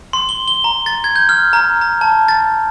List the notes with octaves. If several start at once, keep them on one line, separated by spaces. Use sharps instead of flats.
C6
G7
G7
A#5
A6
G#6
G6
F6
A#5
A#5
A5
A6